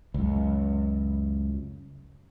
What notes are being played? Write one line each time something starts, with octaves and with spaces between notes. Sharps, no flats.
C#2 F#2